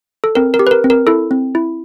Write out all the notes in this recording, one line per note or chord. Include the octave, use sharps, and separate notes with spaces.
A4
C4 A#4
A#4
G4
B4
A#4
C4
A#4
E4 A4
C4
E4